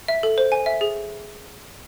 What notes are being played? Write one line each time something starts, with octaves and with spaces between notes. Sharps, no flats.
E5
A4
C5
G#5
E5
G#4